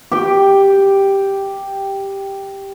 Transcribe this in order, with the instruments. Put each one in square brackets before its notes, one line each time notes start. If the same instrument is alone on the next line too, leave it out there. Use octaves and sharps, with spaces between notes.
[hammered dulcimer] G4 G5